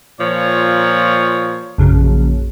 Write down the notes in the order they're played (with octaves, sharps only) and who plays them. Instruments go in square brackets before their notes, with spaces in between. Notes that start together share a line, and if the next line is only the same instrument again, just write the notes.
[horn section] A#2 F3 C#5
[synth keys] A#1 F#2 C#3